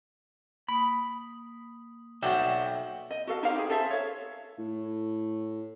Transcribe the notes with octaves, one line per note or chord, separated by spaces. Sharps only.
A#3 B5 D#6
B1 F#3 F#4 D5 E5 G5
D#5
F#4 A4 F5
D#4 G4 C5 F5
G4 G#4
G#4 A4 C5 E5
C#5 F5
A2